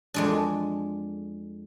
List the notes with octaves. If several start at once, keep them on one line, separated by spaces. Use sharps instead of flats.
F2 G#3 D4